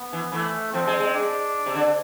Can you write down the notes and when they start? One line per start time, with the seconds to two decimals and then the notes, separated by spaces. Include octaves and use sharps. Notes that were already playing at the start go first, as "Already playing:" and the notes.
Already playing: B3
0.13 E3
0.32 E3 A3
0.73 F3 C4
0.87 G#3
1.00 G#3
1.15 D4
1.66 C3
1.74 D3